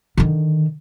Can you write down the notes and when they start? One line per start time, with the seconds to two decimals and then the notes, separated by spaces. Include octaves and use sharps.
0.17 D3 D#3